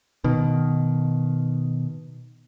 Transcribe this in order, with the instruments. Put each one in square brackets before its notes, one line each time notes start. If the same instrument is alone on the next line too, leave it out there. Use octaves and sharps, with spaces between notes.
[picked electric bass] B2 D#3